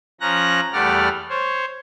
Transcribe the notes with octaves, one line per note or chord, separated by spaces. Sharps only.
F3 C#4 A#5 F#6 A#6
E2 G3 A3 D5 F#5 F6
C5 C#5